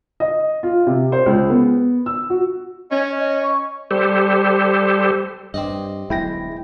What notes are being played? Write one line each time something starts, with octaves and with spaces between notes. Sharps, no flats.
D#5
F4
C3
C5
C#2
B3
E6
F#4
C#4 D#5
D#5
C#6
G3 G4 A4 C5
G2 C4 D5 D#5
D1 B1 G#3 E4 G5 A#6